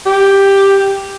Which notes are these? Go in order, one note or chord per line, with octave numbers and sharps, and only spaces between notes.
G4